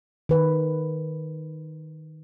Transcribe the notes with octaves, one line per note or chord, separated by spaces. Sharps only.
D#3 B4